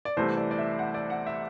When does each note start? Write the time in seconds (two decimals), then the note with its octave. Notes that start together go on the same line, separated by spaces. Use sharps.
0.05 D5
0.17 C2 C3 E3 A3 C5
0.37 D5
0.51 D5
0.58 E5
0.79 F#5
0.94 D5
1.10 F#5
1.26 E5